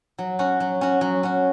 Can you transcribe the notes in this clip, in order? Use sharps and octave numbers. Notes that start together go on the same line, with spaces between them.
F#3
C#4 F#4
F#3
C#4 F#4
F#3
C#4 F#4